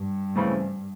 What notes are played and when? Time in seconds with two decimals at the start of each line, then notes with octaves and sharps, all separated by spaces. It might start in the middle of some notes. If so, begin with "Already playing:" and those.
Already playing: G2
0.36 C#3 E3 A3 C4